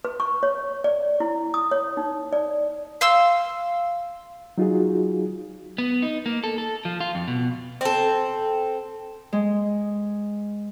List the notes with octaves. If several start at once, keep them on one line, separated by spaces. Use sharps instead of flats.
B4
C#6
C#5
D5
E4
D#6
C#5
D#4
D5
F5 C6 E6
F#3 D#4 F4 F#4 G#4
B3
D#4
A#3
A4
A4
F3
F4
F2
B2
C4 A4
G#3